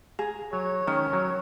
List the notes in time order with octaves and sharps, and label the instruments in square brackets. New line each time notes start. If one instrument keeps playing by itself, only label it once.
[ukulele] G#4 [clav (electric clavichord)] A#5
[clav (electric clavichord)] F#3 [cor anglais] C#5
[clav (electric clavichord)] D#3 [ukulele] C#4
[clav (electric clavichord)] F#3